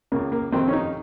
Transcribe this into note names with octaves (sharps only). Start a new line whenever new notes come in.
C#2 C#3 A#3
A#3
F2 C3 D#3 C4
C#4
D#4